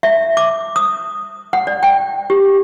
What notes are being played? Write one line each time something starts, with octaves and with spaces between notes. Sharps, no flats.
E5
D6
D#6
F#5
D5
G5
G4